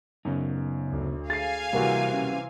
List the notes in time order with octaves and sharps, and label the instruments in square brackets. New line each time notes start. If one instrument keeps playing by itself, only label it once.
[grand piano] F#2 [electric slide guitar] C#3 B3 D#4
[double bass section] D2
[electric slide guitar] G#4 [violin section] F5 G#5 [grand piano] A6 C7
[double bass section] C3 E3 [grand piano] G3 A#3 F#4
[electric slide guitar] C#4